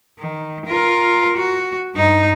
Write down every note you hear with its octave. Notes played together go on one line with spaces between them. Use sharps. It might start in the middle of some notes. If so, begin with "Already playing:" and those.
D#3
F4 A#4
F#4
G2 D#4